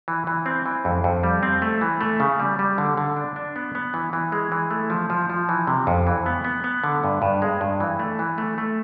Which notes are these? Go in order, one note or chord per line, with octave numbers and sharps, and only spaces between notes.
E3
E3
C4
E3
F2
F2
G3
C4
A3
E3
A3
C#3
G3
G3
D3
D3
D4
D4
B3
B3
E3
E3
G#3
E3
A3
F3
F3
F3
E3
C3
F2
E3
B3
B3
B3
D3
G2
G2
G#3
G2
E3
A3
E3
A3
A3